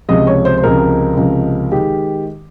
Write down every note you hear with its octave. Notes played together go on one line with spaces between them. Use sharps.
C#2 C3 F3 G#3 D#5
C#5
C5
C5
C#2 C3 F3 G#3 A#4
C#2 C3 F3 G#3
D#3 G#3 G4